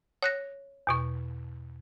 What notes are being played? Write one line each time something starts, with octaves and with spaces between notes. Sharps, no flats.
C#5 F#6 A#6
E2 B2 C#6